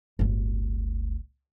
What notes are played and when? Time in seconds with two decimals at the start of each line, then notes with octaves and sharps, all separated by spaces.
0.19 D1 G1